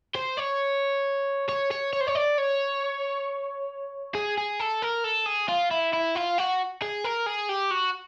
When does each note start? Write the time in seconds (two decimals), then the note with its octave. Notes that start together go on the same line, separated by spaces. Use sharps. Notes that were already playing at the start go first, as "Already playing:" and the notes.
0.16 C5
0.38 C#5
1.49 C#5
1.71 C#5
1.93 C#5
2.01 C5
2.07 C#5
2.15 D5
2.38 C#5
4.15 G#4
4.37 G#4
4.60 A4
4.82 A#4
5.04 A4
5.26 G#4
5.49 F4
5.71 E4
5.93 E4
6.15 F4
6.38 F#4
6.82 G#4
7.04 A#4
7.26 G#4
7.49 G4
7.71 F#4